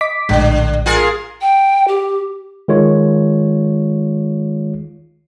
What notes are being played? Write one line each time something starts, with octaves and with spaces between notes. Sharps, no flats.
D#5 D6 B6
A#1 A2 D3 G#3
F4 G#4 A#4
G5
G4
D#3 G#3 F4 C#5